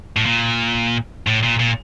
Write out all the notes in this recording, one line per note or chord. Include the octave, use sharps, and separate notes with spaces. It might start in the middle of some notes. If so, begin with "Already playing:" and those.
A2
A#2
A2
A#2
A#2